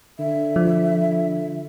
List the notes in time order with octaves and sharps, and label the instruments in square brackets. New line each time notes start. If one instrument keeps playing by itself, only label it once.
[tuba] D3 [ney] E5
[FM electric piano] F3